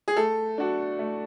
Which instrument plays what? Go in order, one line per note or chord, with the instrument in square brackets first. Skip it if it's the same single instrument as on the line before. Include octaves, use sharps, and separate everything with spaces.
[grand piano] G#4
[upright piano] A3 [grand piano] A4
[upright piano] D4 F#4
A3